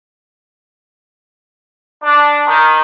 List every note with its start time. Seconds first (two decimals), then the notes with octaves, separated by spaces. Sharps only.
2.02 D4
2.46 D#3